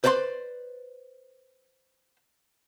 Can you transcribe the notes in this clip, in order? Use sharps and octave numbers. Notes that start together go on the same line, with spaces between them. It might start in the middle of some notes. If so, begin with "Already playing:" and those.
B4 C5 D5 A#5 C6